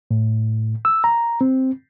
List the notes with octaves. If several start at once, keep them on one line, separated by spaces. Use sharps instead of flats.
A2
E6
A#5
C4